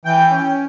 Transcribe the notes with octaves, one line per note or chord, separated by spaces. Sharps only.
E3 G5
C#4